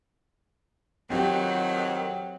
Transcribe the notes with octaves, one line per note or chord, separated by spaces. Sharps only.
F2 D#3 F#3 C4 G4